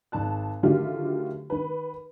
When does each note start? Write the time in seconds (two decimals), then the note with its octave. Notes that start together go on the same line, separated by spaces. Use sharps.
0.12 G#1 A5 F#6
0.63 D3 D#3 F#3 A3 F4 G4
1.50 D#3 B4